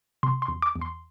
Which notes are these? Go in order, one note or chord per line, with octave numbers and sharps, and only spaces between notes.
C3 C6
C6
E2
D6
E2
C6